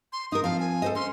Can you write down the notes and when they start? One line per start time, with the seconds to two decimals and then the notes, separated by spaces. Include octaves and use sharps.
0.13 C6
0.32 D#4 A#4 D#6
0.44 F3 C4 F5
0.60 G#5
0.82 A4 C5 D#5
0.95 C#4 C6